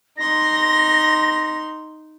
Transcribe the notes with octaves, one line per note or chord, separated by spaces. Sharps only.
D#4 C6 A#6